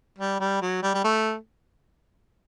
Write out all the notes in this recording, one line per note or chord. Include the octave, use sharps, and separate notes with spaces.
G3
G3
F#3
G3
G3
A3